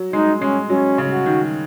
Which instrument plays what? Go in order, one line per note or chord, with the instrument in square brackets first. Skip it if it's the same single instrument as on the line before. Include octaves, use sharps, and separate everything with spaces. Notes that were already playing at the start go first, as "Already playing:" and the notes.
Already playing: [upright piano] F#3
[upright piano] G#3 [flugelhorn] D#4
[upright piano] G#3 [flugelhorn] C#4
[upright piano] F#3 [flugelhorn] C#4
[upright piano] C#3
[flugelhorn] F#4
[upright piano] D#3